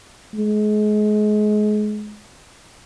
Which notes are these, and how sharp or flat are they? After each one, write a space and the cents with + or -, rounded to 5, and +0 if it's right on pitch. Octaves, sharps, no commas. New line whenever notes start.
G#3 +30